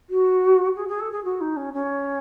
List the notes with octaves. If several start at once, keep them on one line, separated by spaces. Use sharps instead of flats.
F#4
G#4
G#4
A4
G#4
F#4
D#4
C#4
C#4